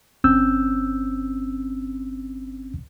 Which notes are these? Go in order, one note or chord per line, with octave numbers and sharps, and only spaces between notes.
G1 C4 C#4 E6 G6